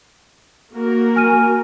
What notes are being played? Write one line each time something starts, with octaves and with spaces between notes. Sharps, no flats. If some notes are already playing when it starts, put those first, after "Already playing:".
A#3 F#4 A#4
G#5 F6 D#7